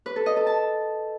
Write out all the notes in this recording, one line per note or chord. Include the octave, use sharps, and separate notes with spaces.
B4
A4
D#5
A4
A5